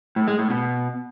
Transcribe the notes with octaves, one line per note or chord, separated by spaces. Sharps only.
A2
G#3
A2
B2